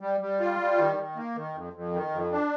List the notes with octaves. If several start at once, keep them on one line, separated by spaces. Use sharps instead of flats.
G3
G3
F4
G3
D#3
D#3
A#3
D#3
F2
F2
D#3
F2
D4